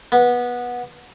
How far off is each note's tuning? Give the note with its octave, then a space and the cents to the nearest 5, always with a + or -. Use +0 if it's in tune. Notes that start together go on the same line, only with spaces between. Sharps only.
B3 -15